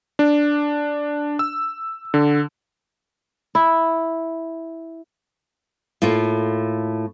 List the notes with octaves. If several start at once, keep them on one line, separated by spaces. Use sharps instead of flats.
D4
E6
D3
E4
A2 A#3 F4